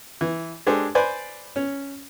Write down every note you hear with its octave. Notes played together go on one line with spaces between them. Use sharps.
E3
G#3 D4 G4 A4 C5 G#5
B4 C5 D5 G#5 B5
C#4